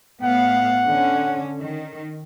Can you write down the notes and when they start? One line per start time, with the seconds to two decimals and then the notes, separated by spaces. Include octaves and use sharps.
0.23 A2 B3 F5 F#5
0.86 D3 C#4
1.61 D#3